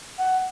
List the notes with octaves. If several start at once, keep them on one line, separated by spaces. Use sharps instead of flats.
F#5